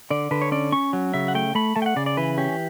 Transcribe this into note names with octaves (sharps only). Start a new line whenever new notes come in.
D3 D5
D3 B4
C#5
C#4 D5
C#4 C#6
F#3
C#3 E5
F#5
A3 G5
A3 B5
A3 A5
G5
F#5
C#3 D5
D5
E3 B4
C#4 G4